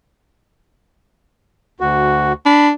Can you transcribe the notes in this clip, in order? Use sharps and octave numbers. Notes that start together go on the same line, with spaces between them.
D2 F#4
D4 B5